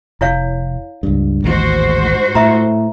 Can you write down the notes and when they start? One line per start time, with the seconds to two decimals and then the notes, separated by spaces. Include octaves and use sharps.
0.21 F1 E4 C#5 F5
1.03 C#2 G2
1.44 A1 D#2 G#2 F#4 C5
2.35 A2 E5 A#5